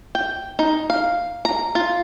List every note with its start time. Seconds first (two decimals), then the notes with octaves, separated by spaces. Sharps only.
0.15 G5
0.59 D#4
0.90 F5
1.45 A#5
1.75 F4